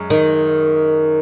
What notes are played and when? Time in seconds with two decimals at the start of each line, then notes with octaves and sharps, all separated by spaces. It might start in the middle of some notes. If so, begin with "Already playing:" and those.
Already playing: F#2 G#3
0.10 D#3